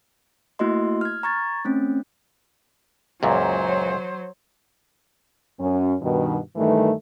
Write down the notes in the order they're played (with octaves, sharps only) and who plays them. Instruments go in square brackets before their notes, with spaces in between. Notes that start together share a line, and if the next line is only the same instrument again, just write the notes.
[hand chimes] A3 A#3 E4 F#4 D#5 C6
F6 G#6
A#5 C#6 G#6 A6
A3 C4 C#4
[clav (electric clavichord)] C#2 F#2 A#2 [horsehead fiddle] F#3 C5
[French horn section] F#2 C#4
G2 B2 D#3
G2 D#3 E3 A3